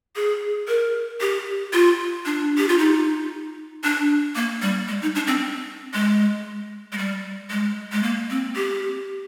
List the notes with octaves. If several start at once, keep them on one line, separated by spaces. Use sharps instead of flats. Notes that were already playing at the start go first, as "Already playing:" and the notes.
G#4
A#4
G4
F4
D4
G4
F4
D#4
D4
A#3
G3
G#3
D#4
D4
C4
G#3
G#3
G3
G#3
G#3
A#3
C4
G4